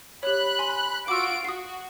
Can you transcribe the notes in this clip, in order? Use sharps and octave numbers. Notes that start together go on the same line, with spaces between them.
G4 C#5 B5 F#6
G#5 C6
F4 F#4 D6 E6 D7
F#4 D#6 C7